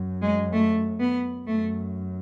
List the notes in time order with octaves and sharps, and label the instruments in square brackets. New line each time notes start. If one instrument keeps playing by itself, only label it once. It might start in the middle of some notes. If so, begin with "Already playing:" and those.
Already playing: [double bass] F#2
[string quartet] G#3
A3
B3
[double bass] F#2 [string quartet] A3